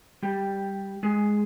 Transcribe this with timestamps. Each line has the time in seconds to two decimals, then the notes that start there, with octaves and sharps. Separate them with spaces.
0.23 G3 G4
1.03 G#3 G#4